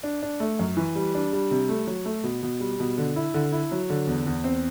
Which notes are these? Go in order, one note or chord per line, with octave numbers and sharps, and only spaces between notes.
D4
D4
A3
F#2
E3
G3
D4
G3
C3
A3
F#3
A3
B2
B2
G3
B2
D3
E4
D3
E4
F#3
D3
E2
E2
C4